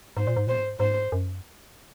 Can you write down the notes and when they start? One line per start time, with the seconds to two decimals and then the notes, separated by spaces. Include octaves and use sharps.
0.17 G#2 C5
0.27 A#2
0.36 G#2
0.47 A#2 C5
0.57 G#2
0.80 G#2 C5
1.12 F#2